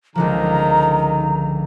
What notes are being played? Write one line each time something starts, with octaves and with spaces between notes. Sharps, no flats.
C#2 D3 D#3 F3 A#5